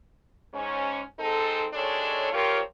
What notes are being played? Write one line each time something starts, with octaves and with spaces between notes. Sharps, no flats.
G#2 C#4
G#3 C4 D#4 A4
D#2 G#3 D4 A4 C#5
F3 C4 F4 G4 A#4 C#5